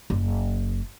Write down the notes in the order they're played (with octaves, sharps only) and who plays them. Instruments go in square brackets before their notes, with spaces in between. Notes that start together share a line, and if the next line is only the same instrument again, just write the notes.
[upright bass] F#1